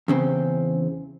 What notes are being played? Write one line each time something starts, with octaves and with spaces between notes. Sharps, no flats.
E2 C#3 C4